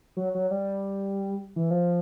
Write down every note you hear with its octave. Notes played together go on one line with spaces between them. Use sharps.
F#3
F#3
G3
E3
F3